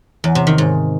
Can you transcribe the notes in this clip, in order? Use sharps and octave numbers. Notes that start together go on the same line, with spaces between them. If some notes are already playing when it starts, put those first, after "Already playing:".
E2
C3
D#3
G#2